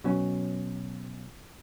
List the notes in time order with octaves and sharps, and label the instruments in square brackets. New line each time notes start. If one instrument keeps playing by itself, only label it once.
[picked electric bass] B2 F#3 C#4